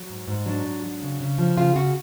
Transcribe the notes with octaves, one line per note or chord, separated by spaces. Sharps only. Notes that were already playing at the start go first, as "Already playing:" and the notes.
Already playing: F#3
G#2
G#2
F#3 D4
G#2
F#3
C#3
C#3
F3
C#3 F4
C#3 F#4